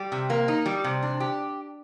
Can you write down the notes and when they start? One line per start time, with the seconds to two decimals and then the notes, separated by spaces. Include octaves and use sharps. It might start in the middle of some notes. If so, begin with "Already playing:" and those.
Already playing: G3
0.12 C3
0.30 A#3
0.48 D#4
0.66 G3
0.84 C3
1.03 D4
1.20 G4